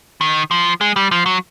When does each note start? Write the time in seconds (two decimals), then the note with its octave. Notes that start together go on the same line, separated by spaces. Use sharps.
0.21 D#3
0.51 F3
0.81 G#3
0.96 G3
1.11 F3
1.26 F#3